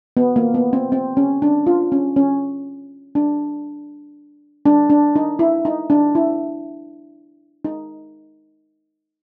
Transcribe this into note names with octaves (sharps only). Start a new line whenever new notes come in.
B3
A#3
B3
C4
C4
C#4
D4
F4
C#4
C#4
D4
D4
D4
D#4
E4
D#4
D4
E4
D#4